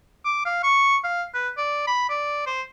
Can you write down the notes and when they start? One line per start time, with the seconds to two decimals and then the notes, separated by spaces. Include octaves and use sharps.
0.25 D6
0.45 F5
0.63 C#6
1.04 F5
1.34 B4
1.58 D5
1.87 B5
2.10 D5
2.47 C5